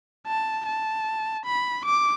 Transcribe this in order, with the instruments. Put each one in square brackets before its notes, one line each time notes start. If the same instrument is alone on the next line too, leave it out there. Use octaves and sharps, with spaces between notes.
[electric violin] A5
A5
B5
D6